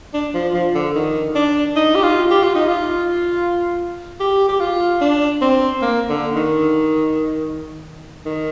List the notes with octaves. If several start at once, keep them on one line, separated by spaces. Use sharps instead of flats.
D4
F3
F3
D3
D#3
D4
D#4
G4
F4
G4
F4
D#4
F4
G4
G4
F4
D4
C4
A#3
D3
D#3
D#3